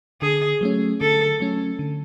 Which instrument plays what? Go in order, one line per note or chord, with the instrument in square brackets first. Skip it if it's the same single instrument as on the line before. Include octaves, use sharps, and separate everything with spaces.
[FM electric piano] D3 [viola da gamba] G#4
[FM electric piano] F#3 A3 C#4
[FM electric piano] D3 [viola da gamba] A4
[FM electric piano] F#3 A3 C#4
D3